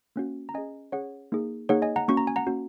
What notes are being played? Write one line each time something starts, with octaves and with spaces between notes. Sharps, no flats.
A#3 C#4 F#4
A#5
C#4 G#4 D#5 G#5
C#4 G#4 C#5 F#5
A#3 D#4 G#4
A#3 D#4 G#4 C#5 F#5
D#5 G#5
F#5 A#5
A#3 C#4 F#4 C#6
A#5
G#5
F#5 A#5
A#3 C#4 F#4